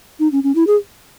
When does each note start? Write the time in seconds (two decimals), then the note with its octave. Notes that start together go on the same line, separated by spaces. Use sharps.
0.20 D#4
0.32 C#4
0.44 C#4
0.55 E4
0.67 G#4